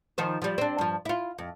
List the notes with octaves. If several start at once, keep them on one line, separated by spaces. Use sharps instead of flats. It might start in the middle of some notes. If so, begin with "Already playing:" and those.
D#3 F3 C5
F3 G3
C4 D4
G2 F3
E4 F4
F2